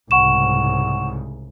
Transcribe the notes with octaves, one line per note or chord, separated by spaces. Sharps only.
C2 G#2 C#3 F#5 C#6 E7